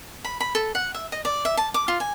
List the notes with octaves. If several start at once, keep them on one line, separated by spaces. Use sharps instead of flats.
B5
B5
A4
F#5
E5
D#5
D5
E5
A5
D6
F4
G#5